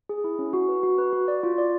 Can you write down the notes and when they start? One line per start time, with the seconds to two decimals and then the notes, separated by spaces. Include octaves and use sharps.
0.09 G#4
0.24 E4
0.39 C#4
0.53 F#4
0.69 B4
0.83 F#4
0.98 B4
1.13 F#4
1.28 D5
1.43 F4
1.58 D5